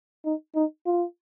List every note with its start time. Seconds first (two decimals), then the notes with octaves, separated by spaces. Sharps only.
0.25 D#4
0.55 D#4
0.86 F4